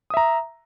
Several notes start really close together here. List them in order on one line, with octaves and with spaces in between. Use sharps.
D#6 E5 A#5